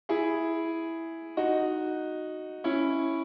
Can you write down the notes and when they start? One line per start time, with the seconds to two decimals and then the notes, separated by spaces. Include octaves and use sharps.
0.09 E4 G#4
1.37 D#4 F#4
2.64 C#4 E4